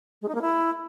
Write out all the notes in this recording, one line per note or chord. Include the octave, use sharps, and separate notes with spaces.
G#3
D#4
A#3
E4